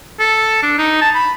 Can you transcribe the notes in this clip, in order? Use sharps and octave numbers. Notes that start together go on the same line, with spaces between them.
A4
D4
D#4
A5
B5